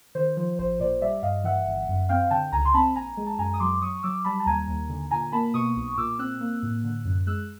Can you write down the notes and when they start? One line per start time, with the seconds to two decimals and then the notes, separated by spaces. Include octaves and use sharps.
0.15 D#3 C5
0.37 F3 C5
0.59 A1 C5
0.80 A#2 C5 D5
1.02 G3 D5 E5
1.22 G2 D#5 F5
1.44 E3 E5 F#5
1.66 G1
1.88 F#2
2.09 C4 F5 G5
2.31 D3 G5 A5
2.52 C#2 G#5 A#5
2.65 C6
2.74 C4 A5 B5
2.95 A#1 G#5 A#5
3.17 G#3
3.27 A5
3.38 F#2 G#5 A#5
3.53 D#6
3.60 F#3 C6 D6
3.82 F#3 C#6 D#6
4.03 F#3 D6 E6
4.24 G3 A5 B5
4.40 A5
4.46 D#2 G#5 A#5
4.68 D#2
4.89 D3
5.11 A#2 G#5 A#5
5.32 A#3 A5 B5
5.54 B2 C#6 D#6
5.76 B1
5.97 A#2 D6 E6
6.19 C4 E6 F#6
6.40 A#3
6.63 A2
6.84 D3
7.05 F#2
7.27 G#3 E6 F#6